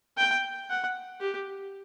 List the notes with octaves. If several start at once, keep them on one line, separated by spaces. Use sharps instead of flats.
G5
F#5
G4